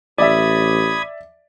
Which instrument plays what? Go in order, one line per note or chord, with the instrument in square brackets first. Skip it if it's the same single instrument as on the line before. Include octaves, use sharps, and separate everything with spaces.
[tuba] A1 [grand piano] D5 E5 [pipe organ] B5 D#6 G#6